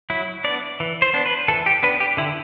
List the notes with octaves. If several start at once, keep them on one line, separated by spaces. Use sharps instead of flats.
F#3 E4
B3 D4 D5
E3
C5
B3 D4
B4
E3 A4
G4
B3 D4 B4
G4
D3 E4